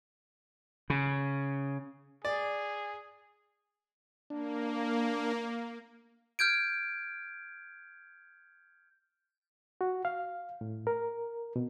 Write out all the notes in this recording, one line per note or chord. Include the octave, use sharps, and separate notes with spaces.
C#3
G#4 D5
A#3 D4
F6 G6 G#6 D7
F#4
F5
A2
A#4
B2